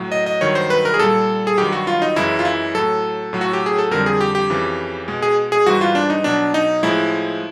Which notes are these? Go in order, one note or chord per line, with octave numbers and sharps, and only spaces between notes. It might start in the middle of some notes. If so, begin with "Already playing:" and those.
Already playing: A2 F#3
D#5
D#5
G2 D#3 F#3 C#5
C5
B4
A#4
G#4
A#2 G3 A4
G#4
G2 D#3 F#3 G4
F#4
F4
D#4
F#2 C#3 E3 G#3 E4
F4
E4
A2 F#3 A4
A2 F#3
F#4
G4
G#4
A4
F2 D3 G3 A#4
G#4
G4
G4
F2 C#3 E3
B2 G#3
G#4
G#4
G#2 E3 G3 F#4
F4
D4
D#4
B2 F#3 D4
D#4
A2 F3 G#3 E4